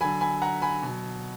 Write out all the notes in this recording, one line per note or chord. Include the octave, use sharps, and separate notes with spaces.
D3 F#3 G#5 B5
G#5 B5
F#5 A#5
G#5 B5
B2 F#3